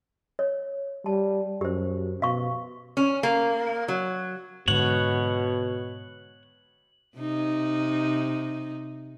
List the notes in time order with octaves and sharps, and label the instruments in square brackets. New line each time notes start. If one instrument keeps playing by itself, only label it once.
[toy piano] C#5
[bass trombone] G3 [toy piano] A5
[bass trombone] F#2 [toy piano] G4 C5
[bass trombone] B2 [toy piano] F5 C#6
[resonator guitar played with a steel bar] C#4
A#3
F#3
[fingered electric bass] G#2 D3 [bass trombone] B2 [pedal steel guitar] C#5 F#5 [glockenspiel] F#7
[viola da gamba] C3 D#4